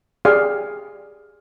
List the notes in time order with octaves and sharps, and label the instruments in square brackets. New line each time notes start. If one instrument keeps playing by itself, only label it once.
[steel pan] G4 G#4 D5 F5